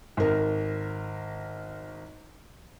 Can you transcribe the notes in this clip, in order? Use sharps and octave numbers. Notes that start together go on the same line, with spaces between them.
G#1 A#4